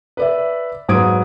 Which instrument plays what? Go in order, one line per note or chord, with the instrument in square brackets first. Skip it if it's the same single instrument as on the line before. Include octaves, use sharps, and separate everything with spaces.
[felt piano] B4 D5 E5
G#2 F#3 B3 D#6 G#6 D7